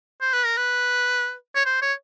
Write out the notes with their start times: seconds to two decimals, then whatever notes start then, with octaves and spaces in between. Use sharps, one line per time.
0.21 C5
0.33 B4
0.45 A#4
0.57 B4
1.55 C#5
1.66 C5
1.82 C#5